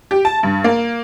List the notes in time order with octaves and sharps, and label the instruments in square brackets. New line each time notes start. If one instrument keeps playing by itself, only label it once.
[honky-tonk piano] G4
A5
G2
A#3